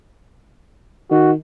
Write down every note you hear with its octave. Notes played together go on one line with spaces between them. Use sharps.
D#3 F#4